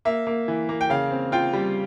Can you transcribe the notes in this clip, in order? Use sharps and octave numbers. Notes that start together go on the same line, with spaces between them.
A#3 E5
A#3
E3
A#3
G5
C#3 F5
C4
F4 G5
G3